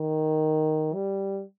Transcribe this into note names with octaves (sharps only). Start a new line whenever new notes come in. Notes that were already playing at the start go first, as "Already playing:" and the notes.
Already playing: D#3
G3